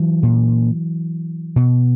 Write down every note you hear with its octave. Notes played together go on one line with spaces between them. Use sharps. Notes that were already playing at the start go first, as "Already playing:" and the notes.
Already playing: E3 F#3
A#2
B2